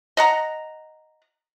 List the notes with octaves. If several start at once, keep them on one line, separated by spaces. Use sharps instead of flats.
D#5 F#5 A#5